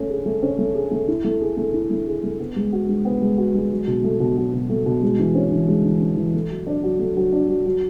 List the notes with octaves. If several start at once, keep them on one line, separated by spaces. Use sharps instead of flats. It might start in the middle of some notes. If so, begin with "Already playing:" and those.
Already playing: A3 C#4
G#4
A3
C#4
A3
G#4
A3
E4
A3
G#4
A3
E4
A3
G#4
A3
B3
G#3
F#4
G#3
B3
G#3
F#4
G#3
F#3
B2
A3
B2
F#3
B2
A3
B2
G#3
E3
C#4
E3
G#3
E3
C#4
E3
A3
F#3
D4
F#3
A3
F#3
D4
F#3
F#3